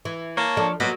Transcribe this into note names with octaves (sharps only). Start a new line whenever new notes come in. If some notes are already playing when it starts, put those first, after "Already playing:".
E3
A#3 C#5 A5
F3 D4 A4
B2 F#3 A#3